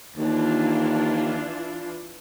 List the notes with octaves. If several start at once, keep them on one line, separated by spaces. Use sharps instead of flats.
D#2 E3 D4 F4